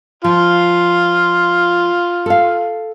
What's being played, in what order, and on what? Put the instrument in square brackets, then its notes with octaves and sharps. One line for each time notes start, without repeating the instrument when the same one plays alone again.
[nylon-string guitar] F3 [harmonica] F4
[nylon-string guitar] A4 F5